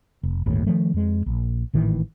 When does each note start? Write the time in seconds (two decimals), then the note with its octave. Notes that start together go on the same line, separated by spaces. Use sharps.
0.23 F1
0.46 G1 D#2 A2
0.67 D#3 F3 G#3 A3
0.94 F2 G#3
1.26 A#1
1.73 G#1 A2 D#3 E3